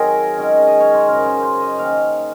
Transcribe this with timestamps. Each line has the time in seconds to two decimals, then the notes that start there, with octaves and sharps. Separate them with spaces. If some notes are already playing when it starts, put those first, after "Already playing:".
Already playing: D#3 F#3 C4 G#4 A#4
0.38 D#3 G#3 C#4
0.67 D#5
0.80 C#5
0.94 C5
1.08 F#2 C#3 F#3 A#4
1.26 C5
1.43 C5
1.61 D#5
1.78 D#3 A#3 C#4 F5